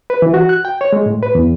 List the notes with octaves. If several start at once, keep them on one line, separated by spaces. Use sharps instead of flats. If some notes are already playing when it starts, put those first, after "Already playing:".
B4
E3
F#4
F#6
G5
C#5
G#3
A2
B4
E2